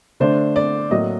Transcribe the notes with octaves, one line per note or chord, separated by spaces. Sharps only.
D3 A3 D4 C5
D5
A2 F#3 A#3 D#5